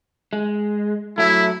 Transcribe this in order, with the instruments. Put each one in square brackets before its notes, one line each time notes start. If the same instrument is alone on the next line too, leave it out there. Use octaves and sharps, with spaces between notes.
[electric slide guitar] G#3
[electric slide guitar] F#3 A3 [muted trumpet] E4